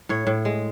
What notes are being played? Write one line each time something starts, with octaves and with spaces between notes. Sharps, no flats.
A2 C#5
A2
G#3